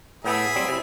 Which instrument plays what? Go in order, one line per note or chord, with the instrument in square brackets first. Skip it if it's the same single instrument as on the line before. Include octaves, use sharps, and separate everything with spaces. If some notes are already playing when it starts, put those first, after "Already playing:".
[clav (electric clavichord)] A2 B3 A4 [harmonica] G#4 E5 B5
[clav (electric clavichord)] F#3 G3 C4
C3 E4